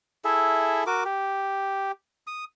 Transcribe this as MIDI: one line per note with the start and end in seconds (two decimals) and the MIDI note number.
0.25 0.84 64
0.25 0.84 68
0.25 0.84 69
0.25 0.84 76
0.87 1.03 66
0.87 1.03 70
0.87 1.03 86
1.05 1.92 67
2.27 2.44 87